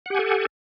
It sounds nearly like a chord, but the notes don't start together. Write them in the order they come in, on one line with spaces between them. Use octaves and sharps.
F#5 G4 G#5 A4